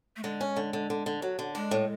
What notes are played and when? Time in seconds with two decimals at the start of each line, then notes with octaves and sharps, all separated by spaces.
0.16 A3
0.23 D3 G#3
0.41 C#4
0.57 D3
0.73 D3
0.90 D3
1.06 D3
1.22 F#3
1.39 D3
1.55 G#3 D4
1.71 A2